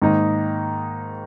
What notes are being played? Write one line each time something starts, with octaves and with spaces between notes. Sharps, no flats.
G#2 D#3 A#3 D#4